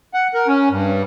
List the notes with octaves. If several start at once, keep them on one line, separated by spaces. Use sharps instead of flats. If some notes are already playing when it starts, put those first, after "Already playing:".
F#5
A#4
C#4
G2